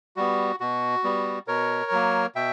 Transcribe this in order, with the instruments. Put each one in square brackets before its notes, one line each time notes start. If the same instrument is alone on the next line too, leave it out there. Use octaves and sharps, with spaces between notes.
[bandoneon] G3 B3 F#4
B2 F#4
G3 B3
B2 A#4 C#5
F#3 A#3
B2 E5 G5